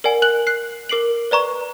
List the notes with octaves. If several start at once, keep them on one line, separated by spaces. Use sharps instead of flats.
A#4 D5 F#5 G#5
A#4 F#6 F#7
F#6 C7
A#4 D6 C7 D7 F#7
B4 D5 A#5 C#6